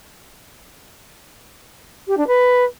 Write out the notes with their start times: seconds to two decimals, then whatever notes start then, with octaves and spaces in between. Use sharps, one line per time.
2.07 G4
2.17 D4
2.27 B4